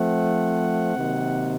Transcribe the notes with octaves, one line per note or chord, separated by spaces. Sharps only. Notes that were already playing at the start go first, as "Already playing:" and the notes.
Already playing: F3 A3 C4 F#5
C3 D#3 F#3 A#3